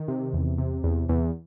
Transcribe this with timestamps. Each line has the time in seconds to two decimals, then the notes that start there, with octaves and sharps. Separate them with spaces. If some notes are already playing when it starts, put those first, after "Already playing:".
Already playing: D#3
0.08 C3
0.33 E2
0.58 C3
0.84 E2
1.09 E2